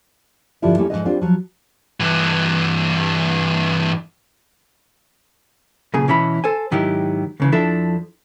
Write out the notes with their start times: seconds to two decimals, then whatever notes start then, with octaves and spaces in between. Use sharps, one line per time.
0.62 G2 D3 F3 G3 E4 F4
0.78 G3 A3 A#3 C#4 E4
0.90 G#2 B2 F3 G#3 B4 D#5
1.05 G3 C4 D4 F4
1.21 F3 F#3
2.00 G2 E3
5.94 B1 A#2 C#3 G#4
6.08 B2 E3 C#4 E4 F#4 B5
6.44 A4 C5 G#5
6.71 G#2 D#3 F#3 E4 G4
7.40 C#2 C#3 E3
7.52 F2 F3 D4 E4 A4 E5